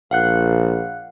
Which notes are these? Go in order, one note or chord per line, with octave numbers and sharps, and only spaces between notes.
A#1 F5 F#5 F#6